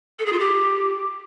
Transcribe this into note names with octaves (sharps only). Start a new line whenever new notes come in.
A4
G#4
F4
G4